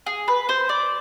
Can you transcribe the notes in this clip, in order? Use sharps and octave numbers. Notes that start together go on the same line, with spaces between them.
G#4
B4
C5
D5